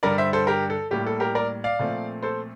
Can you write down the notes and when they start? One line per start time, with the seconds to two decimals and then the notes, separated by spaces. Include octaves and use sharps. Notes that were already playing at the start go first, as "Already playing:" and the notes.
0.03 G2 D3 G3 A#4 D5
0.18 C5 E5
0.33 A4 C5
0.47 G4 A#4
0.70 A4
0.91 A2 G3 A#3 G4
1.06 A4
1.20 G4 A#4
1.35 A#4 D5
1.64 D5 F5
1.79 A#2 F3 A3 C4
2.23 A4 C5